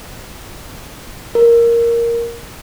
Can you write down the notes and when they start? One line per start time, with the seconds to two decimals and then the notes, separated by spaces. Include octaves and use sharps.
1.35 A#4